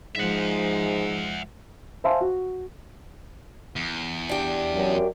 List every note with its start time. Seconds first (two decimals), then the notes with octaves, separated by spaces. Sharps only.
0.15 G#2 F3 G#3 E5 F#5
2.04 C5 E5 F5 G#5 A5 C6
2.21 F#4
3.76 E2
4.29 D4 G4
4.75 F#2